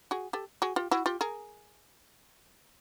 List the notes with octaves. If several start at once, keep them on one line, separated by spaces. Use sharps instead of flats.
F#4 G#4
G4 A4
F#4 G#4
F4 G4
E4 F#4
F4 G4
G#4 A#4